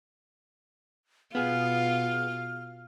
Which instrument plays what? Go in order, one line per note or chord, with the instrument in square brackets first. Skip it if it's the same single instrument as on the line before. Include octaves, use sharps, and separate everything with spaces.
[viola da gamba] B2 F4 [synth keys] B3 G#4 [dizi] F6